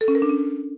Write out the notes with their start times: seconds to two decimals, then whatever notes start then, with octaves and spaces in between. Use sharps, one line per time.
0.01 A4
0.08 C#4
0.15 A#4
0.22 D4
0.29 C#4